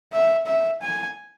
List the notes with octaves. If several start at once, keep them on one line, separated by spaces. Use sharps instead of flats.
E5
E5
G#5